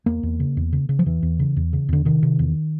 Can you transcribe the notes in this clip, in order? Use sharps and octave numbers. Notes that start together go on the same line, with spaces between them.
E2 A#3
E2
C#3
E2
C#3
C#3
F3
E2 E3
E2
C#3
E2
C#3
E2 D3
C3 D#3
C3
E2